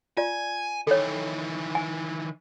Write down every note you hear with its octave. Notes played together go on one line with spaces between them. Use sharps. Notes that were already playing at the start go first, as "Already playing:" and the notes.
F4 D5 G#5
D#3 E3 A4 C#5
G#5